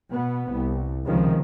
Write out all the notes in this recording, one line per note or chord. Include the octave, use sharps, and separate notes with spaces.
B2 B3
C2
C#2 C3 D#3 F3